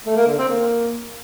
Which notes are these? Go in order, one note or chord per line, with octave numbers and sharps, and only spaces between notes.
A3
A#3
D3
C4
A#3